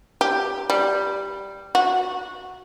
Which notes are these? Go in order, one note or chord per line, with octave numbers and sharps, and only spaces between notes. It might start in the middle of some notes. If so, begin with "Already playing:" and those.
G4
G3
F#4